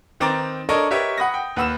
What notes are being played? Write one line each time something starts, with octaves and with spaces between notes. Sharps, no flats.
D#3 C4 B4 A#5 D6 A6
D4 A4 A#4 C#5 D#5 C#6
G4 A#4 B4 C#5 D#5 E5
F#5 B5 D#6 A#6
G5
D#2 B4 F#5 B5 E6 E7